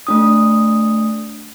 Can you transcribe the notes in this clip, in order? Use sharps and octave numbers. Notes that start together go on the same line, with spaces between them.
A3 D4 D#6